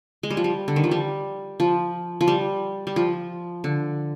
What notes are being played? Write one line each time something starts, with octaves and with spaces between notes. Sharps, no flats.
G#3
G3
F3
G3
D3
D#3
F3
G3
F3
F3
G3
G3
F3
D3